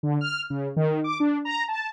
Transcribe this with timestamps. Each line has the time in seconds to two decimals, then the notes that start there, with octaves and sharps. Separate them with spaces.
0.03 D3
0.21 F6
0.50 C#3
0.76 D#3
1.04 D6
1.20 D4
1.45 A#5
1.68 A5